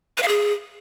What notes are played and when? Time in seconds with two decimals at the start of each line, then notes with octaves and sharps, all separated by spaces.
0.17 B4
0.23 F5
0.28 G#4